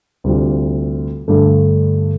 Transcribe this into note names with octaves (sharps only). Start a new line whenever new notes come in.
D2 C3 G3 C4 F4
G2 D3 A3